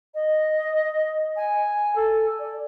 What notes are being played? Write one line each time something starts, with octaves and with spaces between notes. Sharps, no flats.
D#5
G#5
A4
D5